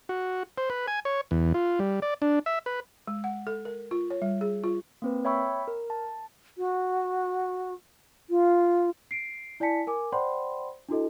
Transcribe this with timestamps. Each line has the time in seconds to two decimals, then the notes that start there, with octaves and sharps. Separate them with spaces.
0.09 F#4
0.58 C5
0.70 B4
0.88 G#5
1.05 C#5
1.31 E2
1.54 F4
1.79 G3
2.02 D5
2.22 D4
2.46 E5
2.66 B4
3.07 G#3
3.24 F#5
3.47 A4
3.65 A#4
3.91 F4
4.10 C#5
4.22 G3
4.41 G#4
4.64 F4
5.02 A#3 C4 B4
5.25 C#5 E5 G5 B5 C#6 E6
5.68 A#4
5.90 A5
6.58 F#4
8.30 F4
9.11 C7 D7
9.60 E4 D5 G#5 A5 B6 C#7
9.87 A#4 G#5 D6
10.12 C5 D5 F#5 G5 B5 C6
10.89 D4 E4 F#4 A4 D#5